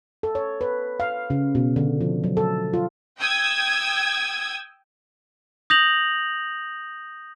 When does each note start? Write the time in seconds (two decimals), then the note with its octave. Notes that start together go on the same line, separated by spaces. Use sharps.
0.23 A4
0.35 C#5
0.61 B4
1.00 F5
1.30 C#3
1.55 B2
1.76 D3
2.01 F3
2.24 F#3
2.37 A4
2.74 F4
3.19 G5 D#6 E6 G#6
5.70 D#6 G6 A#6 F7 F#7